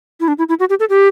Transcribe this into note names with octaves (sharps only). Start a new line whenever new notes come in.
E4
D4
E4
E4
F#4
G4
A4
G4